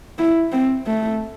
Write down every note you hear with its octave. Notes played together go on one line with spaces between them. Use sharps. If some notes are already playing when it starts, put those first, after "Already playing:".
E4
C4
A3